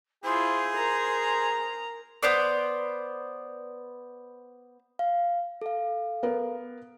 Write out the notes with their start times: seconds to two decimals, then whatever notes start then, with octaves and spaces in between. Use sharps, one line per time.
0.24 E4 F4 G#4 C5
0.75 A#4 A#5
2.23 B3 C5 D5
4.99 F5
5.62 A4 F5
6.23 B3 A#4